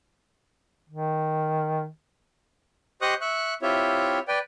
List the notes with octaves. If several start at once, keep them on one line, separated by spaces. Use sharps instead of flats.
D#3
G4 C5 D#5 C#6 D#6 F#6
E5 C#6 F#6
C4 E4 F4 G4 C#5 E5
B4 D5 G5